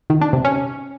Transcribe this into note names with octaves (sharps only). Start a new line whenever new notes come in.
D#3
D4
C3
C#4